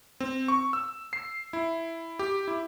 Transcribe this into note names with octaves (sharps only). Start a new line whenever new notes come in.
C4
C#6
E6
C7
E4
G4
E4